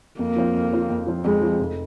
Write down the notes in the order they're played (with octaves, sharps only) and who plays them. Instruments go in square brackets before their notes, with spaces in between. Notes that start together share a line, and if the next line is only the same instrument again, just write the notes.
[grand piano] F2 [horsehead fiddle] A#3
[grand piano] F3 C4 F4
F2
F3 C4 F4
F2
F3 C4 F4
[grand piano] F2 [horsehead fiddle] G#3
[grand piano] F3 C4 F4
F1